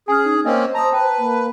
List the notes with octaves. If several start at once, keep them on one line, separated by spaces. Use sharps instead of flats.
C#4 G#4 G#5 F6
D#4
A#3 C4 C#4 C5 D#5
C4 A5 A#5 D#6
B4 G5 A5 A#5
A#3